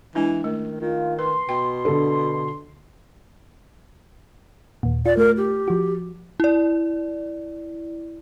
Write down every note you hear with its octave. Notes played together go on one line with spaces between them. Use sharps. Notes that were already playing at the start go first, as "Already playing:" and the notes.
E3 G#3 D4 E4
D#3 A3
D#3 F4
B4 C6
B2 G5
D3 A4
D#2 A#2
F4 D5
A3 A#4
G4
F3 F#4
E4 D5